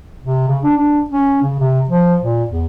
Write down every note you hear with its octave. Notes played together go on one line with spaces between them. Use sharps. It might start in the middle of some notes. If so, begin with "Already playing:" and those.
C3
C#3
D4
D4
C#4
C#3
C3
F3
A#2
E2